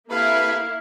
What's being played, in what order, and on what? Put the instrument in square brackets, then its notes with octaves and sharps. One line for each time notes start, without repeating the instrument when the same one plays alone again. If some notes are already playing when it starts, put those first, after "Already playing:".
[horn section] C3 A4 B4 [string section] A#3 E4 [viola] F5